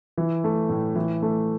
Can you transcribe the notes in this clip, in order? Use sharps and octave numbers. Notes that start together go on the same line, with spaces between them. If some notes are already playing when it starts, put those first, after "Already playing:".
E3
A3
A2
E3
A3